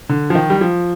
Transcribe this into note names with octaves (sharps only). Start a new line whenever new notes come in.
D3
F3
D#3
G3
F3